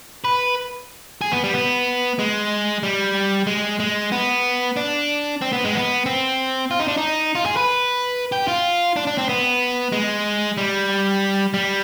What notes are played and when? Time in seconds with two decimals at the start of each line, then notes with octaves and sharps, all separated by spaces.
0.25 B4
1.21 G#4
1.32 B3
1.44 G3
1.54 B3
2.19 G#3
2.83 G3
3.47 G#3
3.80 G#3
4.12 B3
4.77 D4
5.42 C4
5.53 B3
5.65 G#3
5.75 B3
6.06 C4
6.71 F4
6.79 D#4
6.88 D4
6.98 D#4
7.35 F4
7.46 G#4
7.57 B4
8.32 G4
8.48 F4
8.96 D4
9.07 D4
9.18 C4
9.29 B3
9.92 G#3
10.58 G3
11.54 G3